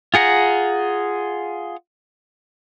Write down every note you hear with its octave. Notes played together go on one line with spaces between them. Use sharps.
F4 G#4 F#5 A#5